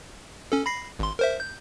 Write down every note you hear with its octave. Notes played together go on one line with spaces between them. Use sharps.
C#4 A4
B5 A#6 C7
G#1 C6
A#4 C5 E5
G6